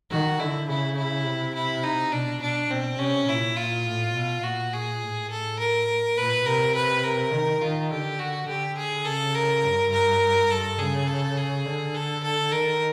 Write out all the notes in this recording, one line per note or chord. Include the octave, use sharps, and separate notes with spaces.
D#3 F#4
D3 E4
C#3 E4
E4
C3
E4
D#4
B2 D4
B2 D4
B2 C4
C3 C#4
A#2 E4
A#2 F4
A2
B2
A#2 F#4
G#4
A2
A4
A#4
A#2 B4
C3 A#4
B4
A#4
D#3
D#3 F4
D3 G4
F#4
D3 G4
G#4
C#3 A4
A#4
G2
A#4
G2 A4
C#3 G#4
A4
G#4
D3
A4
A4
D#3 A#4